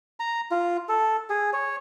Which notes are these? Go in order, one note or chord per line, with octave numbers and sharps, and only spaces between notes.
A#5
F4
A4
G#4
C#5